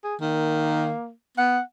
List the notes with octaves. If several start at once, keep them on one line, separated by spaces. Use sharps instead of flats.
G#4
D#3 A#3
B3 F#5